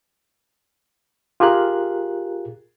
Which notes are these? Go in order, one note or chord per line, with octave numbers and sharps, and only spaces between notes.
F4 G4 G#4 A#4 F#6